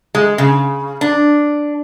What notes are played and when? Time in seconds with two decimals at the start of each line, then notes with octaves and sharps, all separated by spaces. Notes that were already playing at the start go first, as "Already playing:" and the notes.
0.15 G#3
0.38 C#3
1.01 D4